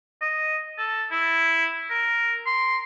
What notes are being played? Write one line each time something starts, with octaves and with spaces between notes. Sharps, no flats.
D#5
A4
E4
A#4
C6